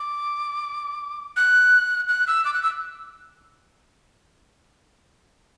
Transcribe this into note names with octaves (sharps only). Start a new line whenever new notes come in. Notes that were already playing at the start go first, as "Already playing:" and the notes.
Already playing: D6
F#6
F#6
E6
D6
F#6
E6